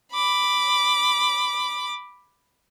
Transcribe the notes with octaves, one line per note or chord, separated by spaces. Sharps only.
B5 D6